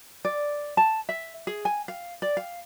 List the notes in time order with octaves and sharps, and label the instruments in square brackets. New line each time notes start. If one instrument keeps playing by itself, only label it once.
[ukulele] D5
A5
E5
G#4
G#5
F5
D5
F5